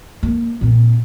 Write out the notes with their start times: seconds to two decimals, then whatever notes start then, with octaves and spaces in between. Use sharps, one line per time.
0.23 A#3
0.61 A#2 C4